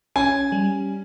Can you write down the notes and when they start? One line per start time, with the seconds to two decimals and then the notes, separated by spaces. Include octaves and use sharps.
0.16 C#4 G#5
0.52 G3